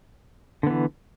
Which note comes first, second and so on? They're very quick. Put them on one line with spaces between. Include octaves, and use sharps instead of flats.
D3 B3 E3